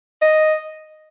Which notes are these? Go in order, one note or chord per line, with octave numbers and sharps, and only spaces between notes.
D#5